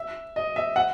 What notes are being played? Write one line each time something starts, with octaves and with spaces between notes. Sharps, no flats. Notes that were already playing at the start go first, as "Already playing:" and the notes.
Already playing: E5
D#5
E5
F#5